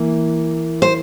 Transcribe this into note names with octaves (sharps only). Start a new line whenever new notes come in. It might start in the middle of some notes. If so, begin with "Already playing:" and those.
Already playing: E3 A#3
C5